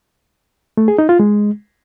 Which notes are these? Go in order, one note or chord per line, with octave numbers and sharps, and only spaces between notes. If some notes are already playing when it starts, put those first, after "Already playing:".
A3
G#4
D#4
F4
G#3